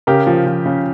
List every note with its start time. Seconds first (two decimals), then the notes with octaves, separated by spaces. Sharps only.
0.07 C#3 G4 A#4
0.27 F3
0.46 F3
0.66 C#3